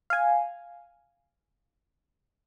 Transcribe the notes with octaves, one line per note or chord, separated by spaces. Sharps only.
F5 G#5